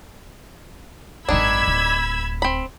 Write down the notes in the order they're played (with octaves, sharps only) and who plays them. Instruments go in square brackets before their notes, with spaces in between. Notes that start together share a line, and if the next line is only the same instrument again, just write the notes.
[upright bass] G#1 F#2 [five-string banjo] D#3 D4 [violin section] B5 E6 G#6
[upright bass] D1
[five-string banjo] C4 B5